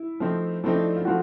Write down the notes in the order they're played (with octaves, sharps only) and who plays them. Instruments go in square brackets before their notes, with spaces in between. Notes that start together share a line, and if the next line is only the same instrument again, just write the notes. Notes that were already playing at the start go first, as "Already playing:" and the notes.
Already playing: [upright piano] E4
[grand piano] F3 A3 C4 D#4
[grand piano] F3 A3 C4 D#4 [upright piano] E4
[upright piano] D4
F4
[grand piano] F3 A3 C4 [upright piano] F#4